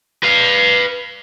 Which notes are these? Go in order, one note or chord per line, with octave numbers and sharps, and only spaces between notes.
B4 F5